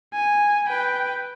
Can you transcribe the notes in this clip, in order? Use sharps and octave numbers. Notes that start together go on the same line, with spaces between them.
G#5
B4 G5